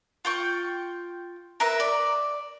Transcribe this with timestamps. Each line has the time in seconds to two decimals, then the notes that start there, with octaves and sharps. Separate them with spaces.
0.25 F4 G5 C#6
1.60 A#4 B4 E5
1.80 D5